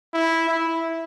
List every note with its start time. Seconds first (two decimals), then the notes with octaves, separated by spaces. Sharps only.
0.13 E4
0.48 E4